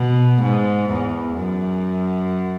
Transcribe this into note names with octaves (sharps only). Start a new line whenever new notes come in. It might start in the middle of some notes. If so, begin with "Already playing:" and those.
Already playing: B2
G#2
E2
F#2